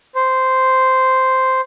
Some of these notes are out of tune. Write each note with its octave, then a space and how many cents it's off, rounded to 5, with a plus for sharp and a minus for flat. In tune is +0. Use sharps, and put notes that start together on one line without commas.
C5 -5